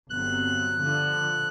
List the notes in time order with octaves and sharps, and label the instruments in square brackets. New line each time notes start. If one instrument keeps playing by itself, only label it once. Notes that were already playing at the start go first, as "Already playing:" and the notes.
[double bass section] G1 F#3 C4 [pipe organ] F#6
[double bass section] D3 F3